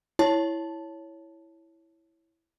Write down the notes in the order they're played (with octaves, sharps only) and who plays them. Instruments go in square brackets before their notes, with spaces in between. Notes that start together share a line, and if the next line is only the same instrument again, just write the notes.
[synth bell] E4 C#5 A5